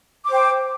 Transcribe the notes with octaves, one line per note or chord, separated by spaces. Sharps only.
C5 G5 D6